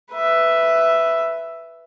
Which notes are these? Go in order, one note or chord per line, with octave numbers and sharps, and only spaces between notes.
B4 E5